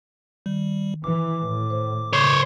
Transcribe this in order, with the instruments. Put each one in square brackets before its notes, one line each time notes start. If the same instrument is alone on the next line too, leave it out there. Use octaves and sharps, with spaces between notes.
[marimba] D#3 [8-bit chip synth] G3
[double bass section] E3 [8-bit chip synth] D6
[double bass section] A2
[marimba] C5
[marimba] C#3 [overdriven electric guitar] C5 C#5